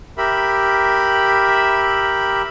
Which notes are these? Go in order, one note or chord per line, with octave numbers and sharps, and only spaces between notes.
G4 A#4 E5 B5